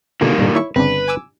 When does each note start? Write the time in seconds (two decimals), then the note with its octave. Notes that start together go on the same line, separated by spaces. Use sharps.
0.21 B2 D3 D#3 G3 A#3 F4
0.38 G2 A#2 D3
0.55 E4 C#5 C#6
0.76 G1 C#3 C4 D4 B4
1.08 G#5 D6 E6